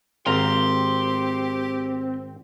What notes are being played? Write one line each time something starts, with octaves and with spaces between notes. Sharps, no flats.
G#1 C4 G4 F5 A#5 C6